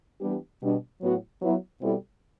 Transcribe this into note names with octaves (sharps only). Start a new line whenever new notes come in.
E3 G3 B3 D4 G4
B2 G3 D4
A2 F#3 B3 F#4
F#3 B3 E4
B2 G3 C4 E4 A4